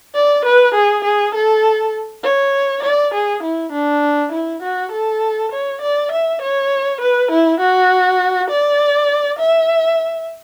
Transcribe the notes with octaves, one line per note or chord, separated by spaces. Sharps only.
D5
B4
G#4
G#4
A4
C#5
D5
G#4
E4
D4
E4
F#4
A4
C#5
D5
E5
C#5
B4
E4
F#4
D5
E5